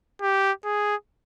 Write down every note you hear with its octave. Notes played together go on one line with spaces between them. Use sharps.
G4
G#4